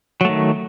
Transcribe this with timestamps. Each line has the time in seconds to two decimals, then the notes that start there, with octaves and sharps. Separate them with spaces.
0.21 F#3
0.25 A3
0.29 D#3